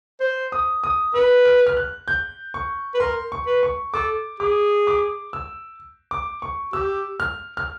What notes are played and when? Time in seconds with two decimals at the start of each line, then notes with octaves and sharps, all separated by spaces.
0.21 C5
0.52 D#6
0.84 D#6
1.14 B4 E6
1.45 F6
1.67 F6
1.77 F#6
2.08 G6
2.54 C#6
2.95 B4
3.00 A#4 C6
3.32 C#6
3.47 B4
3.63 C#6
3.94 A4 D6
4.40 G#4 D6
4.87 D6
5.33 E6
6.11 D6
6.42 C#6
6.73 G4 E6
7.20 F6
7.57 F6